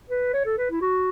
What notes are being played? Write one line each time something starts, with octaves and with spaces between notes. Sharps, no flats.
B4
C#5
A4
B4
E4
F#4